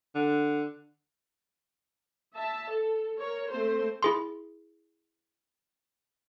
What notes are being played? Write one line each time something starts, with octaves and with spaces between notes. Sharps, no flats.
D3
E5 A5
A4
A#4 C#5
A3 C4 C5
E4 G#4 C6